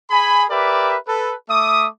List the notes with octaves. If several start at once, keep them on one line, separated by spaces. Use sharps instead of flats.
G#4 G#5 B5
G4 A#4 B4 D5 E5
A4 B4
A3 E5 D6 D#6